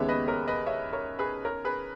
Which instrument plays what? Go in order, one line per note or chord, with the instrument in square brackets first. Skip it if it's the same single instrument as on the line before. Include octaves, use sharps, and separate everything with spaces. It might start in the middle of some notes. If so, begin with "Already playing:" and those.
Already playing: [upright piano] D#2 C#3 G#3 B3 G4 [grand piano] C#5 E5
[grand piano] B4 D#5
A#4 C#5
B4 D#5
C#5 E5
A#4 C#5
G#4 B4
A#4 C#5
G#4 B4